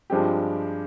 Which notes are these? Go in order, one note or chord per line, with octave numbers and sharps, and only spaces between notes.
G2 F3 G#3 C4 G4